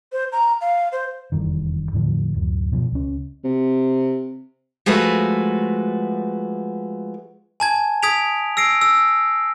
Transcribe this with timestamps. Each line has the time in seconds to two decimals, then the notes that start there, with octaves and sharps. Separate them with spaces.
0.12 C5
0.32 A#5
0.61 F5
0.92 C5
1.32 F1 E2 G2 D#3
1.93 E2 A2 D3 F3
2.34 D1 F#2
2.72 B2 F3
2.92 C#2 C#4
3.44 C3
4.86 F3 G#3 A3 F#4 B4
7.60 G#5 A5 G#6
8.03 D#6 G#6 B6 D7 F7
8.57 E6 A#6 C7 D7
8.81 E6